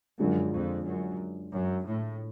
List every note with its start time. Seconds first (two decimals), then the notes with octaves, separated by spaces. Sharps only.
0.19 F#2 D3 F3 G#3 D4 F4
0.52 F2
0.85 F#2
1.51 F#2
1.85 A2